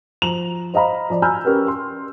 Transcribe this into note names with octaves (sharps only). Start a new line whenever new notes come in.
F3 A#5 F7 F#7
C5 D#5 F5 A#5 B5
F3 D5
G#5 A#5 B5 E6 F6 G6
C#4 G4 A#4 B4
C6